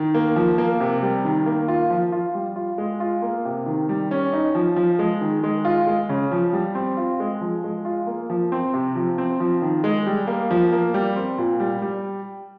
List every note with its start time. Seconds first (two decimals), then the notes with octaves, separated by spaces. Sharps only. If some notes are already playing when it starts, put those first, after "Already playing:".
Already playing: D#3
0.14 A#3
0.36 F3
0.58 A#3
0.80 C3
1.03 G3
1.25 D#3
1.46 A#3
1.68 F4
1.90 F3
2.12 F4
2.35 G3
2.56 F4
2.78 G#3
3.00 F4
3.22 A#3
3.45 C3
3.66 D#3
3.89 G3
4.11 C#4
4.33 D#4
4.55 F3
4.76 F3
4.99 G#3
5.21 D#3
5.44 G#3
5.65 F4
5.87 G#3
6.09 C#3
6.32 F3
6.53 G3
6.75 C4
6.97 F4
7.20 G#3
7.41 F3
7.64 G#3
7.85 F4
8.07 A#3
8.30 F3
8.52 C4
8.74 C3
8.95 F3
9.18 C4
9.40 F3
9.62 D#3
9.84 G#3
10.06 G3
10.27 A#3
10.51 F3
10.72 A#3
10.94 G3
11.16 C4
11.38 A#2
11.60 G3
11.82 G3